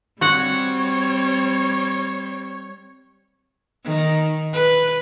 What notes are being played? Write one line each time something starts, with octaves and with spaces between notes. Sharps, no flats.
G3 C4 F#4 C#5 F#5
D#3
B4